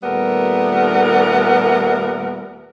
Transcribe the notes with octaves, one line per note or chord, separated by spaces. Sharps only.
D#2 A#2 G3 A3 B3 A#4